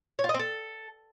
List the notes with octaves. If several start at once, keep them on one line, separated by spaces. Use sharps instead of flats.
C#5
F4
D#5
C4
A4